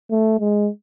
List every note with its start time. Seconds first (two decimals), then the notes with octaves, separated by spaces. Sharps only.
0.11 A3
0.39 G#3